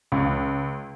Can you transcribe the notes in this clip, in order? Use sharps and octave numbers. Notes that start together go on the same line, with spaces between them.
C#2